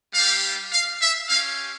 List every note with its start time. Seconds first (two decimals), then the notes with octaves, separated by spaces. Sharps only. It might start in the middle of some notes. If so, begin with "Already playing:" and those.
0.14 G3 D4 G4 F5
0.72 F5
1.01 E5
1.29 C#4 G4 F5